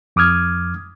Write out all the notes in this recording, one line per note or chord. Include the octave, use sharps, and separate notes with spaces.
F2 D6 D#6 F6 G#6